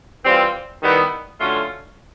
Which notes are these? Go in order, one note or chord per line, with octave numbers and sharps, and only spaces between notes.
E3 G3 C4 F4
D#3 G3 B3 E4
D3 F#3 A3 C#4 F4